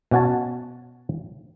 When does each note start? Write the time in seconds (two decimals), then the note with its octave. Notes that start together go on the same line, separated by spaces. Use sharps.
0.11 B2 C#4 F#4 C#5 A5